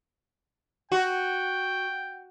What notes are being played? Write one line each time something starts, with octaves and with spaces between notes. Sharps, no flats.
F#4 G5